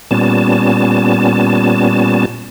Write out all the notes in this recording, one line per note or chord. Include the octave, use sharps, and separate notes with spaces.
A#2 G3 B3 C#4 A5